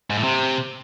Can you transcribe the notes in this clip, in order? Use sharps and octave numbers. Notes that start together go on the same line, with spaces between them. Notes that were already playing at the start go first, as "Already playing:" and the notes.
G#2
A2
C3